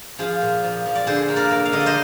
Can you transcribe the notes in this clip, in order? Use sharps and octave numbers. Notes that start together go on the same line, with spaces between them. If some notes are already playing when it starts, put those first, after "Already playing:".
F3 F4 G#4
A#2
F3
F3
D5
D3 G#4 C5
A#3
A#4 D5
A#3
F5
D3 D#5
D5
C5 D#5